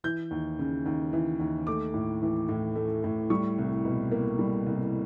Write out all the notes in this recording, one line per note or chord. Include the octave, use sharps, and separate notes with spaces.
E3 G6
D#2
C#3
D#2
E3
D#2
A3 D6
A2
E3
A2
A3
A2
G3 C#6
C2
B2
A#3
G3
C2